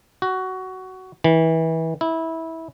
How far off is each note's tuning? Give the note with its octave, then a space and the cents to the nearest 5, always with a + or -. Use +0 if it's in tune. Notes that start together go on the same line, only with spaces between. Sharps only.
F#4 +15
E3 -25
E4 -20